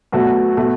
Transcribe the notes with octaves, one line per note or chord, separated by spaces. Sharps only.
B2 F#3 A3 F#4
B2 A3